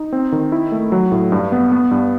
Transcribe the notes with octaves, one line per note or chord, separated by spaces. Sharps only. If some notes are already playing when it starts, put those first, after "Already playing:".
Already playing: D#4
C4
D#3
E4
A3
F#3
A2
G2
B3
B3
G2